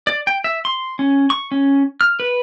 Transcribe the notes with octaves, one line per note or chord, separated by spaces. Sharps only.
D5
G5
E5
C6
C#4
C#6
C#4
F6
B4